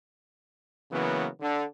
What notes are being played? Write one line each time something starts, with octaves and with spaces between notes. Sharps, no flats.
C#3 E3 F#3 A#3 B3
D3